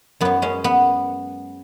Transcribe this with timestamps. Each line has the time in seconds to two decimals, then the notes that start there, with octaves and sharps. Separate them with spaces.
0.21 F#2 F#3 B3
0.42 G#3 C#4
0.64 B3